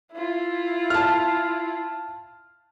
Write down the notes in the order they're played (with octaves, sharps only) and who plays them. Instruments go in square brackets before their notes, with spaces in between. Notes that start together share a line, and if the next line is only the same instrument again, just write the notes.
[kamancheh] E4 F4
[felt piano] A5 F6